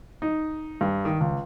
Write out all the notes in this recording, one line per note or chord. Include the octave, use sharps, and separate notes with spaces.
D#4
G2
D#3
C#2